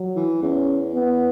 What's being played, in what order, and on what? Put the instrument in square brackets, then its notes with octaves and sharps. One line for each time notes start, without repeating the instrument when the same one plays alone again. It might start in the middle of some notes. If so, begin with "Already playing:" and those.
Already playing: [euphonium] F#3
[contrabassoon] E3
[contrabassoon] E2 [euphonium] C#4
[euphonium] B3